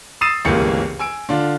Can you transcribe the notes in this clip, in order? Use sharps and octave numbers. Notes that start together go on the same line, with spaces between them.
D#6 E6 A6 C7 D#7 E7
G1 C#2 C3 E3 A#3 C#7
G#5 E6 D7
D3 D4 F4